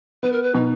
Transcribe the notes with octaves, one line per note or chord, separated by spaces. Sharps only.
B3 B4
A#4
B4
B2 D#4